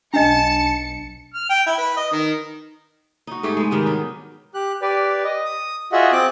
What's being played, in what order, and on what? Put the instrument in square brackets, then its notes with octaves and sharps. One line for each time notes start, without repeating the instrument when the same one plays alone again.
[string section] B1 C#7 [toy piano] D4 D#5 [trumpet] A5
[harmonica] F6
G5
E4
B4
D#5
D#3
[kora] D#4 F#4
G#2 A3 G4 G#4
G#3 B3
G#2 D#3 G3 F#5
F#3 D#4 G4
[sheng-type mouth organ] G4 F#6
G4 B4 D5
D#5
D#6
F4 F#4 G#4 D#5 E5 F#5
C4 G5 D6 F#6